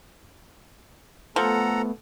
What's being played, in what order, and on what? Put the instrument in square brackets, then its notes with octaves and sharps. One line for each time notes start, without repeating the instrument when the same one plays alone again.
[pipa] F3 [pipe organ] A3 B3 [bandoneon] A4 F#5 A#5